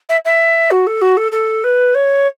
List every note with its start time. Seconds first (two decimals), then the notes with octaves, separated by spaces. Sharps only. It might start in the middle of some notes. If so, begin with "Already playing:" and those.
0.09 E5
0.25 E5
0.71 F#4
0.87 A4
1.01 F#4
1.17 A4
1.32 A4
1.64 B4
1.94 C#5